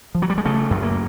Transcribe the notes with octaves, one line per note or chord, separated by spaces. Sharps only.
F3
F#3
G3
G#3
C#3 A3
F#2
A#3